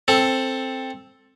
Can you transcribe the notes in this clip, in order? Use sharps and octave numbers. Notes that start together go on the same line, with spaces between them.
C4 A4